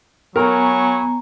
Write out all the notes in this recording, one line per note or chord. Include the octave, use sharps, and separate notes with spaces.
F#3 B3 A#4 G#5 A#5 B5 C#6